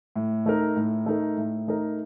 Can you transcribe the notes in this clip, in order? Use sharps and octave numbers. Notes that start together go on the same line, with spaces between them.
A2
A3 D#4 A#4
A2
A3 D#4 A#4
A2
A3 D#4 A#4